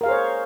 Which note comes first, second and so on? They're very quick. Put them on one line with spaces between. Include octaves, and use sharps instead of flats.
A#4 F5 G#4 C5 C#5